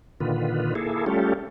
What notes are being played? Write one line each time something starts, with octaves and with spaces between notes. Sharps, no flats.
A#2 D3 D#3 F4 B4
A#3 E4 G#4 A4
G3 A3 C#4 F4 G4 A4